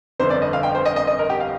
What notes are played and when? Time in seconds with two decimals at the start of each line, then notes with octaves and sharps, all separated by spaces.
0.19 G1 F2 D3 C5
0.30 D5
0.42 D#5
0.53 F5
0.63 G5
0.75 C5
0.85 D#5
0.96 D#5
1.07 D#5
1.19 A#4
1.30 G4
1.40 F5